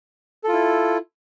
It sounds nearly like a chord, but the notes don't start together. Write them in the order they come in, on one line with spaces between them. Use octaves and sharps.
A4 F4 E4